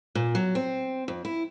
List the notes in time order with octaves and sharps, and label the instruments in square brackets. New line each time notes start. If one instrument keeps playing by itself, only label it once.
[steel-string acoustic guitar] A#2
F#3
C4
F2
E4